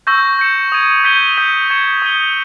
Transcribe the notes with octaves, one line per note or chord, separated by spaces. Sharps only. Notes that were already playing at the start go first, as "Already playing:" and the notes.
C#6 E6 G6 A#6
G6 C#7 E7
D#6 G#6 D#7
G6 B6 D#7 G7
D#6 G6 B6
C#6 G#6 C#7 E7
D#6 A#6 D#7 G7